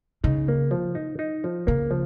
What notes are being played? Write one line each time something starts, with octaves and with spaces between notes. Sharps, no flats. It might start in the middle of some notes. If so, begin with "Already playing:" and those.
C#3 D#4
A#3
F3
D#4
D#4
F3
C#3 A#3
F3